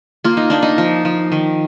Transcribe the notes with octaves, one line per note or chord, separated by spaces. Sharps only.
A#3 F4
D#4
A#3 D4
D#4
F3
F3
D#3